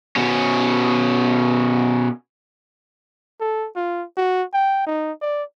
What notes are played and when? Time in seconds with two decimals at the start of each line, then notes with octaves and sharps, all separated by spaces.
0.16 B2 C#4
3.41 A4
3.76 F4
4.17 F#4
4.54 G5
4.86 D#4
5.22 D5